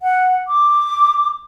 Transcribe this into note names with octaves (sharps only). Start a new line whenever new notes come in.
F#5
D6